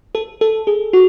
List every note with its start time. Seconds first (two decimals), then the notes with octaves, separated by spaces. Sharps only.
0.15 A4
0.41 A4
0.67 G#4
0.93 F#4